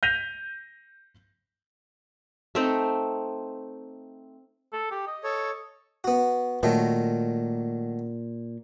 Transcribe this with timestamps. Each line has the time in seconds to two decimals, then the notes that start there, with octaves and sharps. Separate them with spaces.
0.03 G6 A#6 B6 D#7 F7
2.55 A3 C4 D#4
4.73 A4
4.91 G4
5.07 D#5
5.24 A4 C#5
6.04 B3 F#4
6.63 A#2 D#3 F#3 A3